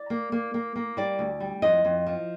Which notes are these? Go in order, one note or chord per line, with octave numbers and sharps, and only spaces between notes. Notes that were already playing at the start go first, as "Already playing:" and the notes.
Already playing: D5
A#3
A#3
A#3
A#3
G3 D5
D2
G3
F2 D#5
F2
F3